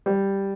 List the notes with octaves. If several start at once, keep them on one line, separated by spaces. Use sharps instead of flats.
G3